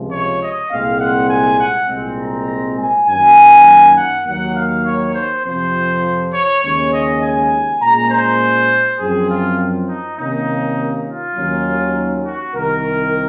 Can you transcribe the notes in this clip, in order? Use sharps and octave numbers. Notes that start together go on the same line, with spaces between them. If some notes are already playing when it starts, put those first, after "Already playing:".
Already playing: C#2 C3 F3 G#3
C#5
D#5
C2 A#2 G#3 C4 F5
F#5
G#5
F#5
C2 A#2 G#3 C4
A#5
G#5
F#2 D#3 F#3 A#3 G#5
F#5
D#2 D#3 F#3 A#3 F#5
F5
C#5
C5
F2 C3 F3 C4 C5
C#5
D#2 C#3 G#3 C#4 C#5
D#5
G#5
A#2 G#3 C#4 A#5
C5
F#2 F3 C4 G#4
F4
D#4
C3 D#3 A#3 C#4 D#4
F4
D#2 D#3 F#3 C#4
F#4
C2 C3 D#3 A#4